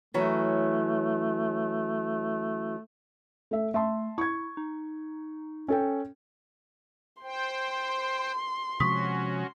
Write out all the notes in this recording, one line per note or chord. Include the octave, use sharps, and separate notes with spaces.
E3 F#3 A3 C#4
A3 E5
A3 E5 A5 C6
E4 C#6 G#6
D#4
C#4 A4 G5
C5 G5 C6
C3 F3 G#3 C#4 F#4 C#6 D#6 B6